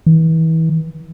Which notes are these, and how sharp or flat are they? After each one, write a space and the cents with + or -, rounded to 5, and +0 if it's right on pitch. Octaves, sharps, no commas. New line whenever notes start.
E3 -35